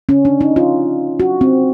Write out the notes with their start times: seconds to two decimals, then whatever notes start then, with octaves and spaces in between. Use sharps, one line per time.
0.09 C#4
0.25 D4
0.41 D#4
0.56 F4
1.20 F#4
1.41 C4